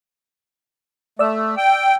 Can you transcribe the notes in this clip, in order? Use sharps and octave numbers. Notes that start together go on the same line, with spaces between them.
A3 D5 E6
G5